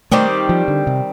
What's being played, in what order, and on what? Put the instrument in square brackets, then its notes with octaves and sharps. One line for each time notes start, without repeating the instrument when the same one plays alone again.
[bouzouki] D#3 G3 C4 G4 [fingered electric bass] A3
[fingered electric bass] F3
D3
C3